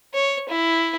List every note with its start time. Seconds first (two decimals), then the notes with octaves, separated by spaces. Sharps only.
0.14 C#5
0.49 E4